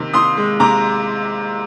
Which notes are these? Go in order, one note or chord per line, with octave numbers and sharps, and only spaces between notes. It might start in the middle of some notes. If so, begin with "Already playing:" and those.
Already playing: C3 D#3
C3 C6 D#6
G#3
C3 A#5 D6